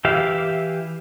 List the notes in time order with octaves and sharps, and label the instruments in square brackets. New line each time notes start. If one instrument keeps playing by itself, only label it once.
[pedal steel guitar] E3 G4 E5 F5